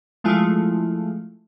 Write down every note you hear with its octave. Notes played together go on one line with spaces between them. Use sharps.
F3 G#3 A3 E4 F4